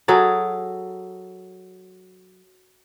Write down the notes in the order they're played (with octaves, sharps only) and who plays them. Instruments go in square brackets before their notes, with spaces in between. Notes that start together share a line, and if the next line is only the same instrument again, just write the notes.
[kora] F#3 G#4 A4